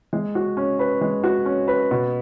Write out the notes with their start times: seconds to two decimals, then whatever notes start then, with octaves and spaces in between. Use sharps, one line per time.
0.13 G#3
0.35 F#4
0.57 C#4
0.79 B4
1.01 G#3
1.24 F#4
1.46 C#4
1.68 B4
1.91 B2